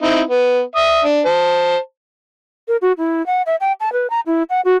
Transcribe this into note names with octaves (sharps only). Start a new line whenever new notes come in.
C4 D#4 E4
B3
E5 D#6
D4
C5 A5
A#4
F#4
E4
F#5
E5
G5
A5
B4
A#5
E4
F#5
F#4